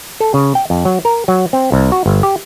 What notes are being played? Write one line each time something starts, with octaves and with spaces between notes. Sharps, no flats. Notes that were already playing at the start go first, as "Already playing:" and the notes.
A4
C#3
G5
F2
F#3
A#4
F#3
C4
C2
F#4
G1
G4